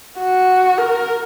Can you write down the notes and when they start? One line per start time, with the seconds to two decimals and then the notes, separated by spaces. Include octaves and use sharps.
0.19 F#4
0.78 A#4